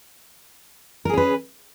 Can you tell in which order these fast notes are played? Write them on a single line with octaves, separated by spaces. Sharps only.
A#4 G#4 C#4 B4